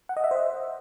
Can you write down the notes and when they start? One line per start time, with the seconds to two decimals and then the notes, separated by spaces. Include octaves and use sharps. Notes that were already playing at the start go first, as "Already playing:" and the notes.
0.09 F#5
0.17 D#5
0.24 E5
0.31 C5